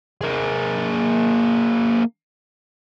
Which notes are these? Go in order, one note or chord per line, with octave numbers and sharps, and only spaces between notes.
A#3 G#4